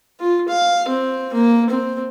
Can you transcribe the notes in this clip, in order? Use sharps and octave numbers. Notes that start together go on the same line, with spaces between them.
F4
F5
C4
A#3
C4